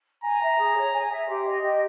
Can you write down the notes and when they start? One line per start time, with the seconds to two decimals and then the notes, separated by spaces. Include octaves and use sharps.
0.24 G#5 A#5
0.41 E5
0.58 G#4
0.76 C#5
0.93 G#5
1.11 E5
1.28 G4 C6
1.46 D#5
1.63 G4